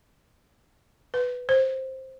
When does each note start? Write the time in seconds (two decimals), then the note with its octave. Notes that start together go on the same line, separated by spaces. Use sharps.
1.14 B4
1.49 C5